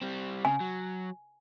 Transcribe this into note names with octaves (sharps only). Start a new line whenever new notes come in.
G3 C4
C#3 G#5
F#3